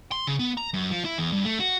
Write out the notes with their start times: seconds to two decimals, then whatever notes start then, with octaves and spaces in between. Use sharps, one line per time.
0.12 C6
0.27 C#3
0.39 B3
0.57 A#5
0.74 F#2
0.91 F3
1.05 E4
1.18 E2
1.32 G2
1.45 A3
1.60 F#4